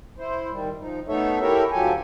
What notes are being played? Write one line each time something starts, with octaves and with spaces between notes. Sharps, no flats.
E4 C5
D#3 G3
F3 D#4
A3 B3 D#4 A4 C#5 E5
E4 G4 A4 A#4 C#5 E5
D2 F3 F#3 G4 A4 G#5